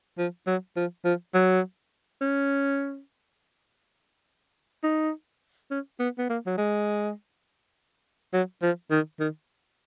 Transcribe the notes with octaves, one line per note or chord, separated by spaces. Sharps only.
F3
F#3
F3
F3
F#3
C#4
D#4
C#4
B3
B3
A#3
F#3
G#3
F#3
F3
D#3
D#3